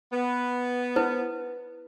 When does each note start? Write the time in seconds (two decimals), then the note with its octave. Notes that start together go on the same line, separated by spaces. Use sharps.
0.11 B3
0.96 E4 B4 C5